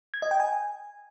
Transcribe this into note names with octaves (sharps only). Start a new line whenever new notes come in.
G#6
D#5
G5
G#5